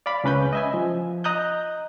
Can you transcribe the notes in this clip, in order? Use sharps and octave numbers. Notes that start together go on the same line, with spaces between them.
D5 F5 B5
C#2 C#4 B4 B5 G6
D#5 E5 G#5
F3
D#5 A#5 D#6 F#6 G6